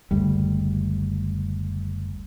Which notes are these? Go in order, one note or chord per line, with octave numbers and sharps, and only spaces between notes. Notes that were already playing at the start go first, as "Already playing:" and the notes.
F#1 D2 G3